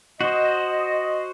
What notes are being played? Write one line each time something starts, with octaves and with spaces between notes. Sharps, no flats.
F#4 C5 D#5